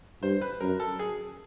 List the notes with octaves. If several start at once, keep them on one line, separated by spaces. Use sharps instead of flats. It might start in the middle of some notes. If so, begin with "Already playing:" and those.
G2 C5
B4
F#2 A#4
A4
G#4